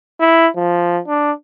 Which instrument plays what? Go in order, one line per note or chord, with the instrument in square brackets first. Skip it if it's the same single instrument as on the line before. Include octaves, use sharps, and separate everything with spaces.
[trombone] E4
F3
D4